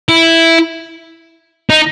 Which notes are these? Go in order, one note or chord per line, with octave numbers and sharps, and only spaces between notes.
E4
D#4